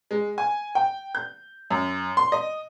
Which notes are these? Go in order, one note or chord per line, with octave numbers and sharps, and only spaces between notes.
G#3
G#5
G5
G6
F#2
C6
D#5